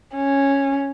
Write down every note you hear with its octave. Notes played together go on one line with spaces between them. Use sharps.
C#4